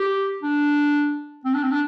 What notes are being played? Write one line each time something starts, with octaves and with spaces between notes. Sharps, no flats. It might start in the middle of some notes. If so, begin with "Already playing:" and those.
Already playing: G4
D4
C4
D4
C4
D4